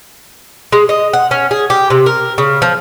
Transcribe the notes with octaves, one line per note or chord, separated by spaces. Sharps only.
G#3
D#5
F#5
C#4
G#4
G4
C3
A#4
C#3
F3